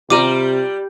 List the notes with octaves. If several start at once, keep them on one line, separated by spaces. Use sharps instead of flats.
C3 G3 F4 A#5 D6 D#7